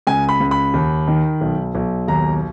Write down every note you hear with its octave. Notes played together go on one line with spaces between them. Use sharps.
C#2 G#5
B5
C#2
B5
D#2
D#3
B1
B1
D#2 A#5